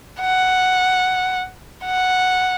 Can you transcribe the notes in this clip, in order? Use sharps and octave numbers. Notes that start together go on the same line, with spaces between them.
F#5
F#5